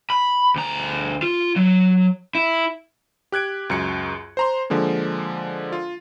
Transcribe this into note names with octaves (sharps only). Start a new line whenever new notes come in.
B5
D2 A#5
F4
F#3
E4
G4 F#6 G#6 D7
C#2 F#2 C#7
C5 A#5 C6
D3 F3 G#3 A#3
F4